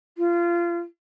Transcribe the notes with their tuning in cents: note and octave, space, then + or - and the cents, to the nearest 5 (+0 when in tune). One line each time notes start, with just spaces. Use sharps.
F4 -25